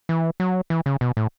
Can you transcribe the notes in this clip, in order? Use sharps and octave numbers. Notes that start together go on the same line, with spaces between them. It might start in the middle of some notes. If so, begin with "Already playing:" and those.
E3
F#3
E3
C#3
B2
A2